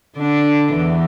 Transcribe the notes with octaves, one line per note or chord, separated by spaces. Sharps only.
D3 D4
E2 E3